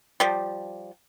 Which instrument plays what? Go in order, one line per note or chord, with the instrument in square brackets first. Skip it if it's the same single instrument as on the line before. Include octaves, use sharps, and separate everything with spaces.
[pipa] F3 G3